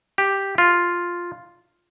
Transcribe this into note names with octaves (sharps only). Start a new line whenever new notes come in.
G4
F4